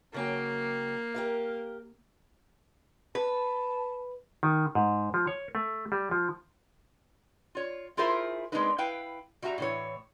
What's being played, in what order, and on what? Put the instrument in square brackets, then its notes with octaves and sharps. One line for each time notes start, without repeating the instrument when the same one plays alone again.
[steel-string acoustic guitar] C#3 F#3 G5 [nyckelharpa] A#3
[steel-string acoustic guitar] G4 A#4 F5
[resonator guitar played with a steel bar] B4 [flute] A5
[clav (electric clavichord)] D#3
G#2
F3
C#5
A3
G3
F3
[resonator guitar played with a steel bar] F4 C#5
E4 F4 G#4 A#4 C5 E5
G#3 A#3 C4 D4 D#4 B4
E4 B4 F5 G5
G3 F#4 E5 A5 A#5
A2 E3 C#5